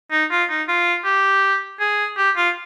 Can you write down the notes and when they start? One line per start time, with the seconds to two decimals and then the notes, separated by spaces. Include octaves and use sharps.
0.12 D#4
0.31 F4
0.50 D#4
0.68 F4
1.05 G4
1.80 G#4
2.17 G4
2.37 F4